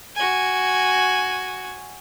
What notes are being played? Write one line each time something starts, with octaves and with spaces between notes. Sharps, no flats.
F#4 G#5